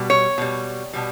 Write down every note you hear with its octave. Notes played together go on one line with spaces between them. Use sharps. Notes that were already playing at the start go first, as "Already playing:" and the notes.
Already playing: B2 G3
C#5
B2 G3
B2 G3